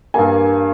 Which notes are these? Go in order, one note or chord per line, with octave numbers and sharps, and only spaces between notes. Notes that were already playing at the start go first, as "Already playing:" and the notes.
G2 G3 A#3 G#5